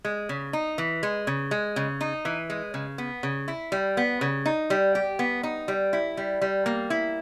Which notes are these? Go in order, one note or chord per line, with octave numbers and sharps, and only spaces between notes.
G#3
C#3
D#4
E3
G#3
C#3
G#3
C#3
D#4
E3
G#3
C#3
B3
C#3
E4
G3
B3
C#3
D#4
G3
G4
B3
D#4
G3
E4
G3
G3
A#3
E4